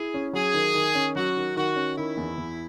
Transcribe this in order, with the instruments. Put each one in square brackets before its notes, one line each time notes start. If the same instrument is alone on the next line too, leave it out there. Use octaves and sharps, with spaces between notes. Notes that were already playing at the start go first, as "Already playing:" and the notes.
Already playing: [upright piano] E4 [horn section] G#4
[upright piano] C#4
[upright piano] F#3 [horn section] G#4
[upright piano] D#3
D#3
C#4
[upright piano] F#3 [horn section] F#4
[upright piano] D#3
[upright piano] D#3 [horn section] F#4
[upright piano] C#4
[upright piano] D#3 [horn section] E4
[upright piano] E2
E2